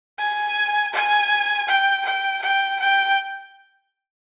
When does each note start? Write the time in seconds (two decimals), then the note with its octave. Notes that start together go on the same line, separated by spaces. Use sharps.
0.19 G#5
0.94 G#5
1.68 G5
2.06 G5
2.42 G5
2.80 G5